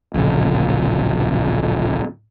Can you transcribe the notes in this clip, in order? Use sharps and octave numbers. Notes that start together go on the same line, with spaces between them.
D1 A#1 C#3